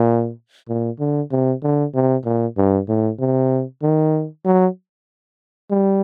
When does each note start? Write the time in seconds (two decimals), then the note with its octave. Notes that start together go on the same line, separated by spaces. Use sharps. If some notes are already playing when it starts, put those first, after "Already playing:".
Already playing: A#2
0.69 A#2
1.00 D3
1.31 C3
1.63 D3
1.95 C3
2.25 A#2
2.57 G2
2.89 A2
3.20 C3
3.83 D#3
4.45 F#3
5.71 G3